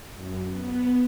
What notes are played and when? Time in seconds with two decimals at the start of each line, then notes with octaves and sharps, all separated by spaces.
0.13 F#2
0.47 B3